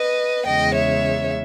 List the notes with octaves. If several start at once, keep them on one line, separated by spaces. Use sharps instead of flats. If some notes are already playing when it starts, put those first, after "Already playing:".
Already playing: B4 D#5
E2 C#3 G#3 D#5 G5
C#5 E5